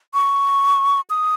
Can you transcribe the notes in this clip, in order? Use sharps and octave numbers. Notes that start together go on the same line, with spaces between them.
C#6
D#6